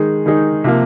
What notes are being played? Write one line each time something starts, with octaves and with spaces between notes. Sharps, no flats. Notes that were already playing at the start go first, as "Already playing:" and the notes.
Already playing: D#3 G#3 D#4 G#4
D#3 G#3 D#4 G#4
C3 F3 A#3